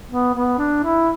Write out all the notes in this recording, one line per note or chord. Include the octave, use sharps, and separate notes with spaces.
B3
B3
D4
E4